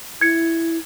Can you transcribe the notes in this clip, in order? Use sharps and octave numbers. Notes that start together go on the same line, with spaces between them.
E4 G#6 C#7